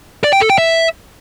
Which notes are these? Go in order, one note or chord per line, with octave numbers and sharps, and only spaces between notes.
D5
G5
A4
G5
E5